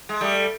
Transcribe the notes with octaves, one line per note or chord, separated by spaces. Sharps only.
G#3
G3 A3